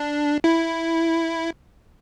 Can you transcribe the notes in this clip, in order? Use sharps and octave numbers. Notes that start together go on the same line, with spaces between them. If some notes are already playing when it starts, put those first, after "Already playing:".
Already playing: D4
E4